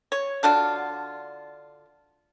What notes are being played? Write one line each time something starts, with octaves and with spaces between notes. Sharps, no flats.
C#5
D3 D4 F4 F#4